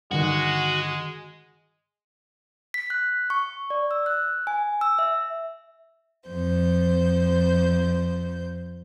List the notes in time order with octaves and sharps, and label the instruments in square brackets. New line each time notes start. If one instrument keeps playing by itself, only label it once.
[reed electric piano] G2 D3 D#3 [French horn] G#3 [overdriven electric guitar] F#4
[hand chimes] B6
F#6
C#6
D5
E6
F#6
G#5
E6
E5
[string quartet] F2 C5 G6